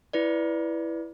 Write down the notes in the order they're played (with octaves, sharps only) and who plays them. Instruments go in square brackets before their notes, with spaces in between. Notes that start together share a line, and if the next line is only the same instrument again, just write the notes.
[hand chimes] E4 B4 D5